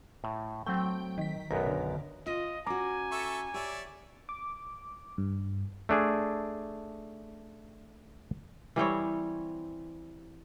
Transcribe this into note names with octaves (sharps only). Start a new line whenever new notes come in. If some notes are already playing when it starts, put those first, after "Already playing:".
A2
F#3 A3 C4 G5
D#3 B6
B1 F#2 B3 A#4
D3
F4 D#5
C#4 F#4 G#5 A#5 D6
A4 E5 C#6
G4 C#5 D5 E5
D6
G2
A3 D4 G#4
E3 G3 C4 C#5